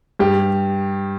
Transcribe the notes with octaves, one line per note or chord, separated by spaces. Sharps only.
G2 G4